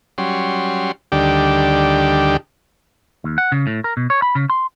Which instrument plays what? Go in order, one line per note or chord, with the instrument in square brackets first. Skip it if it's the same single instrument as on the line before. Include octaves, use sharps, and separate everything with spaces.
[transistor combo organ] F#3 G3 C#4 C6
D2 D3 D#3 G3 G4
[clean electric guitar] D#2
F#5
C#3
A2
A#4
B2
C#5
B5
C#3
C6